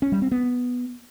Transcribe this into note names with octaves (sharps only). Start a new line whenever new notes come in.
C#4
G3
C4
B3